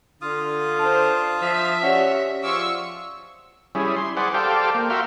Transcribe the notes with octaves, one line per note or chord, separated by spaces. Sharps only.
D3 F4 F5 D#6
D4 C5 A5
F3 E5
C#4 F#4 G4 D5 F#5
F3 F4 G#4 F5 C#6 D6 E6
G3 C#4 E4 G#4
C6
G#4 B4 C5 D5 F#5
G4 A4 C5 D5 F5 G5
A#3
F#4 A#4 E5 F5 G5 C6